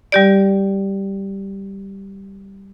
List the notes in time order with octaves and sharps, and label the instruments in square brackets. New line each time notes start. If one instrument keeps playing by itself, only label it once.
[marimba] G3 G4 D5